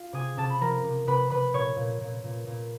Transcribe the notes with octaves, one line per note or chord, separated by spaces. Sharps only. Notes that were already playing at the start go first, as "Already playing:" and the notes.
Already playing: F4 F5
C3 G#4 G#5
C3 A4 A5
B5
F3 A#4 A#5
C3
C3 B4 B5
C3 B4 B5
A#2 C#5 C#6
A#2
A#2
A#2
A#2